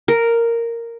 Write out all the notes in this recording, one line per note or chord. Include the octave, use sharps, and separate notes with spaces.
A#4